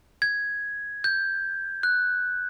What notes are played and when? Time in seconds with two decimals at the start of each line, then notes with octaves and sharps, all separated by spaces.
0.22 G#6
1.04 G6
1.83 F#6